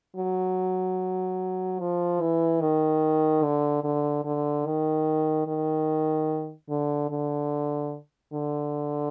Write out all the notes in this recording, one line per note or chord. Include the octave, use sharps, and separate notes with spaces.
F#3
F3
E3
D#3
D3
D3
D3
D#3
D#3
D3
D3
D3